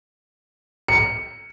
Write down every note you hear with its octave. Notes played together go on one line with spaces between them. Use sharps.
C#7